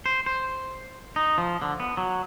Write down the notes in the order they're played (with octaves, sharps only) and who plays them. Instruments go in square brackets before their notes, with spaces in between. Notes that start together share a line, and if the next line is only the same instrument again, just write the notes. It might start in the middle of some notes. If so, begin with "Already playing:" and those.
[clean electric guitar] C5
C5
D#4
F3
D3
B3
F#3